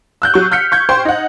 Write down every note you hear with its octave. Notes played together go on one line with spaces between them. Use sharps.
E6 F#6 G6
F#3 C#6
F6 G6 B6 C#7
C#6 G6 G#6
C5 G5 C6 C#6
D#4 F#5